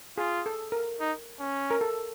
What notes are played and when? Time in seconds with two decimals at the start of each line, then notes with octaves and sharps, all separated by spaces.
0.18 F4 G#4
0.46 A4
0.72 A#4
1.00 D#4
1.40 C#4
1.71 A#4
1.81 A4